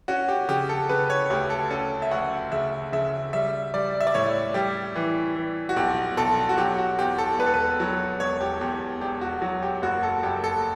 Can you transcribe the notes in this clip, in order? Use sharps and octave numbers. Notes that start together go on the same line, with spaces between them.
C#4 F#4
G4
C#3 G4
A4
C#3 B4
C#5
D2 G4
A4
C#4 A4
E5
D2 F#5
C#3 E5
C#3 E5
G3 E5
G3 D5
E5
D5
A2 C#5
G3 G4
E3
E3
F#4
B1 G4
B1 A4
F#4
F#3 G4
F#4
E2 G4
A4
E1 B4
A4
B4
F#3
E1 C#5
G4
E2 G4
E1 G4
F#4
F#3
G4
F#1 F#4
A4
F#1 G4
A4